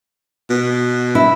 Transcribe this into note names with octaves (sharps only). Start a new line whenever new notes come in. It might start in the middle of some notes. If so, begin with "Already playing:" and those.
B2
E4